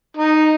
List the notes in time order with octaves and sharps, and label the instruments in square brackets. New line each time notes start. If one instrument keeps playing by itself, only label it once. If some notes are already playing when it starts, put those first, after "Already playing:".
[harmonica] D#4